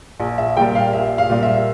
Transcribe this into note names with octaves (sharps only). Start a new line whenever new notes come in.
A#1
E5
A#2 G3 G5
F5
A#1 E5
F5
A#2 G3
E5